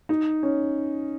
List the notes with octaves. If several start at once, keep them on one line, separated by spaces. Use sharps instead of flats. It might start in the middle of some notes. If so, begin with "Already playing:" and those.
D#4
C#4